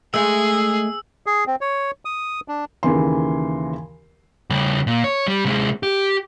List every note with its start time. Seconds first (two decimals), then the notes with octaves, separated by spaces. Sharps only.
0.14 G#3 A3 G#4 E6
1.26 G#4
1.47 C4
1.61 C#5
2.05 D#6
2.48 D4
2.83 D#2 C#3 E3 C6
4.50 C#3 G3
4.87 A#2
5.04 C#5
5.28 G3
5.45 C3 G#3
5.83 G4